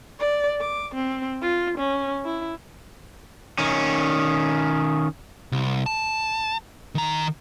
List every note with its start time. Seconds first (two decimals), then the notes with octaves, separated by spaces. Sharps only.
0.19 D5
0.61 D6
0.95 C4
1.41 F4
1.78 C#4
2.25 E4
3.59 D#3 C#4
5.52 C2
5.86 A5
6.95 D#3 A#5